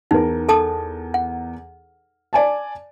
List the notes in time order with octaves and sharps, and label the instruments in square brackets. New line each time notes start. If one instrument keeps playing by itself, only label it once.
[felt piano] E2 A#4 [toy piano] D#4
[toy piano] A4 A5 D#6
F#5
[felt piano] D5 G#5 A5